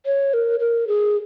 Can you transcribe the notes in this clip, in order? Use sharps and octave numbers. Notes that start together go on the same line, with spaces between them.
C#5
A#4
A#4
G#4